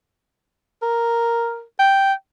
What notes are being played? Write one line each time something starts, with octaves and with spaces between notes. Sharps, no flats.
A#4
G5